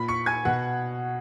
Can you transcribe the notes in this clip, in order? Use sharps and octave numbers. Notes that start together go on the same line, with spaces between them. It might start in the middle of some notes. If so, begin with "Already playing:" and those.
Already playing: A#2 B5 B6
C#6 C#7
G#5 G#6
B2 F#5 F#6